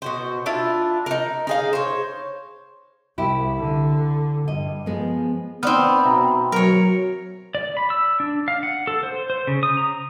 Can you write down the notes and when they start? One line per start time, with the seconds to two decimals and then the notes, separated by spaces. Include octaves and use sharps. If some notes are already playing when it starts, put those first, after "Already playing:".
0.02 B2 F#4 C5
0.46 D4 E4 F4
1.06 D#4 A#4
1.47 D#4 G#4 F5
1.73 C5 C#5
3.18 C2 E4 G4
3.57 D3
4.48 G2 D#5
4.86 F3 G#3 B3
5.63 B3 C4 D#4 D5 F6
6.05 B2 E5 A#5
6.52 F#3 A#4 C#5
7.55 D5
7.77 B5
7.90 E6
8.20 D4
8.48 F5
8.63 F#5
8.87 A4
9.03 C5
9.30 C5
9.47 C#3
9.63 D#6
9.77 A#5